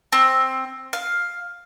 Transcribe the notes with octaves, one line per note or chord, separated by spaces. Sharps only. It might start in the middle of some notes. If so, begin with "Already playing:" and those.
C4
F5